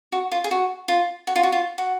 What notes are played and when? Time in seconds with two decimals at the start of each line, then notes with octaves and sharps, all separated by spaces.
0.12 F#4
0.32 F4
0.44 G#4
0.51 F#4
0.88 F4
1.27 F#4
1.36 F4
1.43 F#4
1.52 F4
1.78 F#4